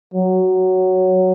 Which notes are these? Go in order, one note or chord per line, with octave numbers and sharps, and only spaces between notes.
F#3